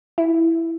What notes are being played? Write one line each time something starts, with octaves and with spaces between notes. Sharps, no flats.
E4